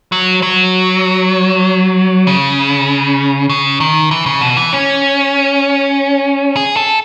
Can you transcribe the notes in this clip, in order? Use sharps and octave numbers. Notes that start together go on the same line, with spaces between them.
F#3
F#3
C#3
C#3
D#3
E3
C#3
B2
E3
C#4
G#4
A4